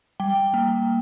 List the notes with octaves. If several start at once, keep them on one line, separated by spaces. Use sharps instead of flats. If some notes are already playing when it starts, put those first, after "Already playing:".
G3 G5
A#3